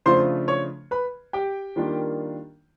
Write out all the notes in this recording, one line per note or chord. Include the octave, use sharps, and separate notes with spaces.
C#3 F3 A3 D4 F4 C5 C6
C#5 C#6
B4 B5
G4 G5
D#3 G3 A#3 D4 F4